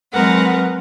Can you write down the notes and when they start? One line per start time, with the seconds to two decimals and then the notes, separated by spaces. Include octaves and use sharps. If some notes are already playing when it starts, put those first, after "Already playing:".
0.12 F#3 G#3 C4 A#4 B4 F#5